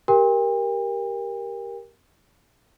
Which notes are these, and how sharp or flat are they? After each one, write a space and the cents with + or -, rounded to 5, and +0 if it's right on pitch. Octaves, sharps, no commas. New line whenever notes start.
G4 +0 A#4 +5 G5 +40